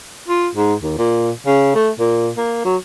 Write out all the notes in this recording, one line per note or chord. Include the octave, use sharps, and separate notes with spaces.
F4
G#2
D#2
A#2
C#3
A3
A#2
A#3
F#3